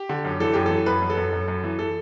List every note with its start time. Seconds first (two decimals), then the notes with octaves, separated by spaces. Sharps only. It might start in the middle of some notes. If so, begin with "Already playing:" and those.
Already playing: G4
0.09 D3
0.25 F#2
0.40 E3 A4
0.53 F#2 G4
0.66 E3 A4
0.86 F#2 B4
1.02 F#2
1.10 A4
1.17 F#2
1.33 F#2
1.48 F#2
1.64 E3
1.79 A4